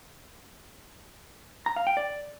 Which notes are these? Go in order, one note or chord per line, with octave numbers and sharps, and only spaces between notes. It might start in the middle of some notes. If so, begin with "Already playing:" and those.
A#5
F5
G5
D5